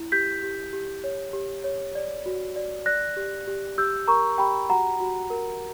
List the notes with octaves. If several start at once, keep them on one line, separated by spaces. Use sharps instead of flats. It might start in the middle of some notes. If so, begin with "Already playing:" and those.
Already playing: E4
G4 G6 B6
G4
G4
C#5
G4
C#5
D5
F#4
D5
D5 F#6 A#6
G4
G4
G4 E6 G6
A#4 A#5 C#6
G4 G5 B5
F#4 F#5 A#5
F#4
A#4